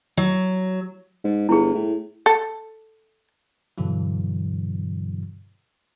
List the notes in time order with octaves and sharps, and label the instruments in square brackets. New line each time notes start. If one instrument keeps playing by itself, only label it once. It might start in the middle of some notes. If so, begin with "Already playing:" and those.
[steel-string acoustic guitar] F#3
[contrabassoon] G#2
[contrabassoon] G1 [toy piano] E4 G#4
[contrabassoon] A2
[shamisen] A4
[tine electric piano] G2 B2 D3 E3 F#3